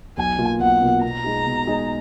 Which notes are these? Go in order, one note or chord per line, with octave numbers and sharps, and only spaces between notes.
B1 G#5
B2 A#3 F4
B1 F#5
B2 A#3 F4
B2 A#5
G#3 D#4 G#4
B2
G#3 D#4 G#4